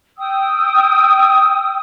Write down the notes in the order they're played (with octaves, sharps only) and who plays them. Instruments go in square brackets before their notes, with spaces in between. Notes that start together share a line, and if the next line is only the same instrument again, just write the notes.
[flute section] G5 D#6 E6